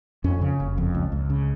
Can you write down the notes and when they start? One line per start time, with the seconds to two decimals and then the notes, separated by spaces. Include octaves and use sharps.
0.24 F2 C#4
0.41 C#3
0.60 F#1
0.78 F2
0.95 C#2
1.12 C#2
1.30 C#3